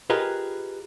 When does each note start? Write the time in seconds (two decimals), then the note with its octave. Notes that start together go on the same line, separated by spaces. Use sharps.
0.10 F4 G4 G#4 A#4 B4 D#5